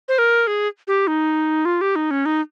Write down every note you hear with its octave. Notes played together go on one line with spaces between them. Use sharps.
C5
A#4
G#4
G4
D#4
F4
G4
D#4
C#4
D#4